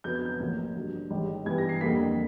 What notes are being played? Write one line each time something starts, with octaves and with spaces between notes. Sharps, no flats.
F2 D3 F#3 B3 G6
G#6
G6
A1 A2 F3 A#3
G2 D3 F#3
A1 G#2 D#3 G3
G2 E3 G3 B3 G#6
A#6
C7
F2 D3 G3 A#3 B6